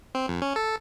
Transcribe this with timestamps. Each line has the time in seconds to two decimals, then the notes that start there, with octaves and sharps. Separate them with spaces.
0.15 C4
0.28 F2
0.42 C#4
0.56 A4